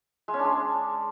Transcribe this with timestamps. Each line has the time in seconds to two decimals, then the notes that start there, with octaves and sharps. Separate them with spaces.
0.28 G#3
0.34 C#4
0.39 D4
0.45 G#3